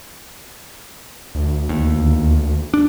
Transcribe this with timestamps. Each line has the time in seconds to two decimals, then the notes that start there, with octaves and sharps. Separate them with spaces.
1.35 D2
1.69 D#2
2.74 D4